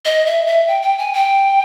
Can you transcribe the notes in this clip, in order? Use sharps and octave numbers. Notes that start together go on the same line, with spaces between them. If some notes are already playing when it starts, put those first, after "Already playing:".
D#5
E5
E5
G5
G5
G#5
G5